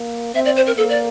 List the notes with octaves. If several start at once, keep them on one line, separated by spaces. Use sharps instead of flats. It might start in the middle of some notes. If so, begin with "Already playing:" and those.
Already playing: A#3
C4 E5
D5
C5
A#4
A#3 A4
D5